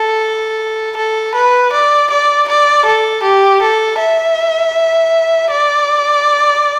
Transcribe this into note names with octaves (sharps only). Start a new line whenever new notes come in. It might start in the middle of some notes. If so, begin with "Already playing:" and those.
Already playing: A4
A4
B4
D5
D5
D5
A4
G4
A4
E5
D5